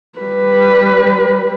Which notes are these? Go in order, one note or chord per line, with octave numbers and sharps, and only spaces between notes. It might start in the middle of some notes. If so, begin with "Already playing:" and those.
G3 B4